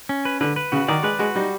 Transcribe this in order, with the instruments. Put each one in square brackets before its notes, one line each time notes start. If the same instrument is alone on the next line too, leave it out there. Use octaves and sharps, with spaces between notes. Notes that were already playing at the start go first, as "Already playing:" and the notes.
[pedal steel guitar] C#4
B4
[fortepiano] D3 [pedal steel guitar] B4
[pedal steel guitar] B4
[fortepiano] C#3 [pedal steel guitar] F#4
[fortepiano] D#3 [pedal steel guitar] D5
[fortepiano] G#3 [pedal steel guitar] B4
[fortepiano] G#3 [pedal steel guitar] F#4
[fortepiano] G3 [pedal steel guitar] D#4